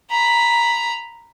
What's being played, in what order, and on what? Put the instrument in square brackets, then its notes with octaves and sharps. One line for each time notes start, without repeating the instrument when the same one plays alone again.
[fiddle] A#5 B5